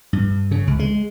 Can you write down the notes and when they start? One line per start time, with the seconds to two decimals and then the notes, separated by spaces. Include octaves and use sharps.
0.13 G2
0.51 C#3
0.67 C#2
0.79 G#3